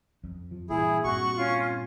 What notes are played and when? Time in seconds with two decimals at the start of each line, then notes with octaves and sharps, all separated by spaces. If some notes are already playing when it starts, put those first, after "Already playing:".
0.24 F2
0.51 F3
0.70 G2 A#2 E3 E4 G#4
1.04 G2 A#2 C4 F#4 C#6
1.36 C#4 F4